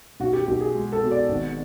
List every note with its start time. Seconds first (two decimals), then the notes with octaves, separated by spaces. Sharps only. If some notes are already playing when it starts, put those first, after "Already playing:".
0.20 B1 F#4
0.33 G4
0.47 B1 G4
0.61 G#4
0.75 G#3
0.92 A4
1.02 B2
1.11 D5
1.29 G#1